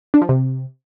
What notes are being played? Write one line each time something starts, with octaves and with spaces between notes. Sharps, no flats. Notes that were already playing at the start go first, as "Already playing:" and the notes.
D4
F3
C3